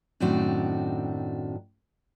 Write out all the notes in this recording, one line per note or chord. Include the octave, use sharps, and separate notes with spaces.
F#2 A2 D#3 C4 D4 F#4